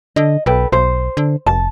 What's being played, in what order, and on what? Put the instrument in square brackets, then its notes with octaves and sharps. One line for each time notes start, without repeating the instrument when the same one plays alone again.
[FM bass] D3 [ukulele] D#5
[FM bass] B1 [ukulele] A4 B4 G5
[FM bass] B1 [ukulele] C5
[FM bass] D3
[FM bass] F1 [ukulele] A5